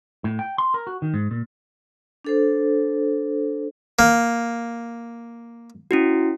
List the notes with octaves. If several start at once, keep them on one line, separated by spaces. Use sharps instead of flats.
A2
G5
C6
A#4
F#4
D#3
G#2
A#2
D4 A4 C5
A#3
C#4 E4 F#4